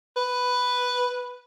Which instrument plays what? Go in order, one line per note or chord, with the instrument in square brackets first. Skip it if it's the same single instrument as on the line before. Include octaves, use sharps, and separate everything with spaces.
[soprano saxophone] B4